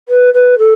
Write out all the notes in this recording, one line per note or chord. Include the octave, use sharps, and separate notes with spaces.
B4
B4
A4